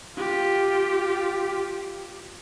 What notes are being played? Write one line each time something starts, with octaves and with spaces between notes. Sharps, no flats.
F4 G4